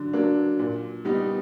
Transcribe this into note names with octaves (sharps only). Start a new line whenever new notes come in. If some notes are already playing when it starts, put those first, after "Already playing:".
Already playing: D3 F#3 D4
F#3 A#3 D4
A#2
G3 B3 D#4